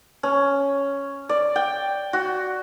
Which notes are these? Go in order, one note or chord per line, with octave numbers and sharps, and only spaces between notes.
C#4
D5
G5
F#4